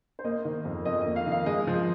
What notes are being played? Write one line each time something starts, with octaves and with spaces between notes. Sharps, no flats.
C5
A#3 D#5
D#3
F2
F2 D#5
A#3 D#5
F5
D#3
F5
G#3 D#5
F3